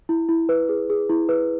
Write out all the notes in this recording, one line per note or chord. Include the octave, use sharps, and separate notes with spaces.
E4
E4
B4
G#4
G#4
E4
B4